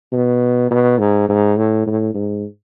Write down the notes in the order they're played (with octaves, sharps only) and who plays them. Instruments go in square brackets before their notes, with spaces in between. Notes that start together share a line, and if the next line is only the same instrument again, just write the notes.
[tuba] B2
B2
G#2
G#2
A2
A2
G#2